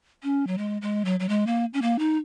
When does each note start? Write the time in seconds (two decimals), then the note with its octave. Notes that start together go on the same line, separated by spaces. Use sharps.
0.23 C#4
0.47 F#3
0.58 G#3
0.82 G#3
1.05 F#3
1.20 F#3
1.29 G#3
1.47 A#3
1.74 C#4
1.82 A#3
1.99 D#4